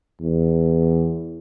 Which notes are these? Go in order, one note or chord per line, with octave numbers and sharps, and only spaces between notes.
E2